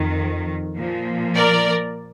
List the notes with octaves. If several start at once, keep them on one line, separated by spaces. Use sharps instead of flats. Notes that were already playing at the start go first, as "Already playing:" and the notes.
Already playing: F2 D#3
A#2 F3
A#4 D5